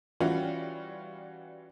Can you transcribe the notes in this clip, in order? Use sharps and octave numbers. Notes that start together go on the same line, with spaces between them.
E3 G3 C#4 F4 F#4